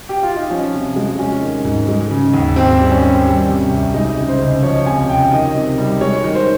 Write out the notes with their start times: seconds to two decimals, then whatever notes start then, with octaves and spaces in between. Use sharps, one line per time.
0.09 G4
0.23 F4
0.36 D#4
0.50 F3 C#4
0.73 C3
0.96 G#3
1.19 G#3 C#4
1.42 D#3
1.65 G#2
1.88 G#3
2.11 C#3
2.34 D#2
2.56 G#2 C4
2.79 G3
2.91 C#4
3.03 G3
3.26 G3
3.48 C3
3.71 C2
3.94 G#3 D#4
4.17 C#3
4.29 C5
4.40 C#2
4.63 F3 C#5
4.86 C3 G#5
5.09 C#2 G5
5.32 D#3 D#5
5.55 C3
5.78 G3
6.01 G#3 C#5
6.24 D#3
6.35 C5